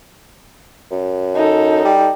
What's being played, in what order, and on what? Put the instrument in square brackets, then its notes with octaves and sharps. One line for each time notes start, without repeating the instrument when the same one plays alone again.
[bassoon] F#2
[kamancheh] D#4 A4
[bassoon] G3